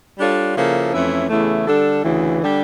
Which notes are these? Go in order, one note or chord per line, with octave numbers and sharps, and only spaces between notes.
G3 D4 F4 A4 C#5
C#3 F3 A#3 E4 A4
F2 E3 A3 C#4 E4
E2 C#3 E3 A3 E4
D3 G3 D4 A4
D2 C#3 E3
D3 G3 D4 G4